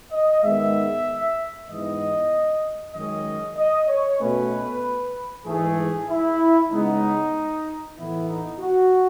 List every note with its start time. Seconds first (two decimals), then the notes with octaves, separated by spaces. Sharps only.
0.11 D#5
0.43 G#2 D#3 G#3 B3 E5
1.69 G#2 E3 B3 D#5
2.94 F#2 D#3 G#3 C#4 D#5
3.57 D#5
3.88 C#5
4.20 B2 A3 C#4 B4
5.45 G#2 E3 A3 G#4
6.08 E4
6.71 C#3 G#3 B3 D#4
7.96 A2 E3 B3 E4
8.28 D#4
8.60 F#4